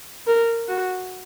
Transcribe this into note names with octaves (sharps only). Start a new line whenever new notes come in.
A#4
F#4